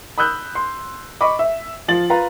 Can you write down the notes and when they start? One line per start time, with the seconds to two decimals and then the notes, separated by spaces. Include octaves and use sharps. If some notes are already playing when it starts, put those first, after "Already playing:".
0.18 B5 D#6 E6 F#6 G6
0.55 C6
1.21 D#5 B5 C#6 D6
1.39 E5
1.88 F3 F4 A6 F#7
2.10 F4 B4 A#5